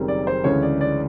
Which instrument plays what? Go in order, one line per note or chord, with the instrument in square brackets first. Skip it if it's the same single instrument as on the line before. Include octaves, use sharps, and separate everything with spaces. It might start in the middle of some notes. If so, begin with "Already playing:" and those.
Already playing: [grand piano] F#1 F#2 D#3 G3 C4
[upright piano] D5
C5
[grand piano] D2 C#3 E3 G#3 C#4 [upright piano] C#5
[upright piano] D5
D5